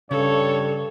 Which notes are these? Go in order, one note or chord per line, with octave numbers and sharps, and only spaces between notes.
G2 C#3 A4 C#5